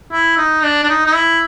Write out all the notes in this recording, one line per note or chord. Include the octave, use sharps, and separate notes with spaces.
E4
D#4
D4
D4
D#4
D#4
E4